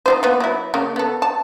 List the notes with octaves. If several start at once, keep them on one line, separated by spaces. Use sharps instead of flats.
D#4 F4 C5
A#3 B3
F#3 E4
C#3 A#3
B3 A4
A5